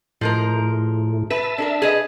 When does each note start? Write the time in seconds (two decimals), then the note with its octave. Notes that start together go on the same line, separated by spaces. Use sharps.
0.21 A2 F3 G#3 A#4
1.30 B4 E5 A5
1.58 D4 A4 A#4
1.82 G#4 B4 D#5